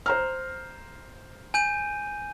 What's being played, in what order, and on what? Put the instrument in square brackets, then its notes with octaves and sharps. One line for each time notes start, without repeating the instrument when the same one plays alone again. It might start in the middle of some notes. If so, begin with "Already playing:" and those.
[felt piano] C5 A#5 F6
[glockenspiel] G#5 G6 D#7